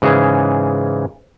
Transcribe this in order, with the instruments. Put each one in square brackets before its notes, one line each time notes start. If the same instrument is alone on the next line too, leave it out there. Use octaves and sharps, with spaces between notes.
[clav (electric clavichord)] G#2 C#3 E3 G#4